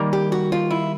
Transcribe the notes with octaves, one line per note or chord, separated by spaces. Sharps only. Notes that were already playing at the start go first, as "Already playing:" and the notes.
Already playing: D#3 G3 A#3 D#4
G4
F#4
F4
E4